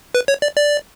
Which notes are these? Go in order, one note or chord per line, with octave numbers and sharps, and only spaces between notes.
B4
C#5
D5
D5